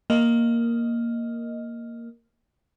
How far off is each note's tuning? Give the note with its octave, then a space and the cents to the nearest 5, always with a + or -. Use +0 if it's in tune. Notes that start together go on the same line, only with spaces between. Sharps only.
A#3 +0 D#5 +0